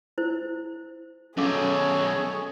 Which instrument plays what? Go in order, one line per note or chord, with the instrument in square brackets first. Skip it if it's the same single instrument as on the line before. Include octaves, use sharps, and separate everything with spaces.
[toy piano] E4 C5
[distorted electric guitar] F#2 B2 [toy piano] C#4 F5 D6 [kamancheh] G#4 C#5 [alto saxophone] A4